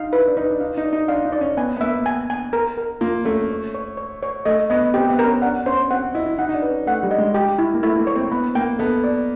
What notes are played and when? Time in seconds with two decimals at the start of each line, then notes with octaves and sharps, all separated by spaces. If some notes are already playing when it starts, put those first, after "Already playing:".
Already playing: D#4 F5
0.13 E4 B4
0.28 D4
0.37 D#4 B4
0.50 D4
0.60 D#4 F5
0.77 D#4
0.84 D5
0.93 D#4
1.08 D4 F5
1.25 D#4
1.32 D5
1.41 C#4
1.57 B3 G#5
1.77 B3
1.81 A#3 E5
2.06 G#5
2.30 G#5
2.53 A#4
2.78 A#4
3.01 A#3 F4
3.25 A3 C#4
3.50 C#5
3.74 C#5
3.97 C#5
4.23 C#5
4.45 A3 D#5
4.70 B3 D#5
4.94 C4 G4
5.10 B3
5.19 A#4
5.26 C#4
5.42 D4 F#5
5.66 C#4 C5
5.91 C4 F#5
6.14 E4 D#5
6.26 E4
6.38 D#4 F#5
6.49 D#4
6.54 D4
6.62 B4
6.70 C#4
6.87 A3 F#5
7.03 G3
7.11 D#5
7.18 G#3
7.34 G4
7.58 E4
7.74 A#3
7.83 A3 E4
7.99 A#3
8.07 C#5
8.15 C4
8.31 B3 B5
8.55 A#3 G5
8.79 B3 A4
9.04 D5